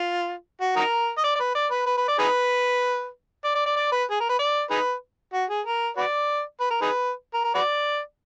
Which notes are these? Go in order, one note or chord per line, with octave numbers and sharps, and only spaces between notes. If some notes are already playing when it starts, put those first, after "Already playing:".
Already playing: F4
F#4
D#4 F#4 A#4
D#5
D5
D5
B4
D5
B4
B4
B4
D5
D#4 G#4 B4
D5
D5
D5
D5
B4
G#4
A#4
B4
D5
D#4 G#4 B4
F#4
G#4
A#4
F#4 B4 D5
B4
A#4
D#4 G#4 B4
A#4
A#4
F#4 B4 D5